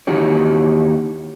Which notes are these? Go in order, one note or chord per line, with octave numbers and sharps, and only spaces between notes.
D#2 E3 D#4 F#4 G4 C#5